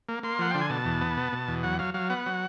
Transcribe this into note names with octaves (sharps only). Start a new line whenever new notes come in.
A#3
A#3 C6
F3 F#5
D3 G5
G#5
B2 A5
E2
B3
B2
B2
E2
F#3 F#5
F#3 F5
F#3 F5
B3 F#5
F#3